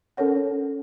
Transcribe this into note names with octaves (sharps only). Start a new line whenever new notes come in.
C#4 A4 A#4 C#5 F#5